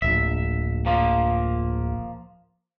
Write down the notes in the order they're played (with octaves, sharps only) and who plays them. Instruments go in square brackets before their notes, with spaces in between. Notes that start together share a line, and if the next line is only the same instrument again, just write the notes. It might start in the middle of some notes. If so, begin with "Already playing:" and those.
[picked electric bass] D1 A#1 [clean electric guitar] E5
[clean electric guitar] F3 A#3 F4